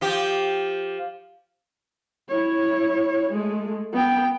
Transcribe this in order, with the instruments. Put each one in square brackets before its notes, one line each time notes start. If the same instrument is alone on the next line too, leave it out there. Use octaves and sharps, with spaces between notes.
[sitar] F3 G4
[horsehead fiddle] E4 C#5
G#3 A3
B3 G5